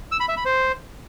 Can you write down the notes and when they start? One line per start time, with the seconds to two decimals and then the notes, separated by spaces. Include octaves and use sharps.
0.12 E6
0.20 B5
0.28 E5
0.37 B5
0.45 C5